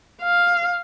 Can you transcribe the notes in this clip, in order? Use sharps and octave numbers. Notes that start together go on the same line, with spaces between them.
F5